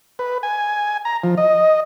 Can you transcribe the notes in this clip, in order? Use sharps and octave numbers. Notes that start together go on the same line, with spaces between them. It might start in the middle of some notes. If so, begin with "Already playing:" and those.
B4
G#5
A#5
F3
D#5